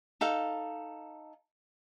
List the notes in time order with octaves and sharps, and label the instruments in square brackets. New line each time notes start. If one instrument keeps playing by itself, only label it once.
[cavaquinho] D#4 A4 F5